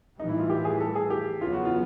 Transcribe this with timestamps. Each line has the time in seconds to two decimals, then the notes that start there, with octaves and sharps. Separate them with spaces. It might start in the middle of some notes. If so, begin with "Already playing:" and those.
0.20 A2 E3 G3 D#4
0.29 E4
0.39 F4
0.50 G4
0.65 G#4
0.80 A4
0.95 G#4
1.10 G4
1.41 E2 C#3 F#3 B3 F4
1.53 F#4
1.65 F4